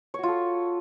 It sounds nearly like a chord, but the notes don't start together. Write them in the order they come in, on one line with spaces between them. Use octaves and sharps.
C#5 F#4 F4 A4